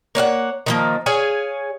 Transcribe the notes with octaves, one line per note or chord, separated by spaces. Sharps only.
A#3 C#5 F5 F#5
D#3 F3 A#3
G#4 C#5 F5 G#5